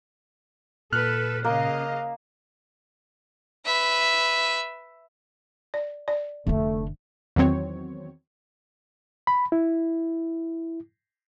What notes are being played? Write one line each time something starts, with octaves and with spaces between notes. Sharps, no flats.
A#2 A4 B4 F6 F#6
C#3 A#3 D#5 F5
B4 E5
D5
D5
F1 D3 A3
E2 D#3 F#3 C4 C#5
B5
E4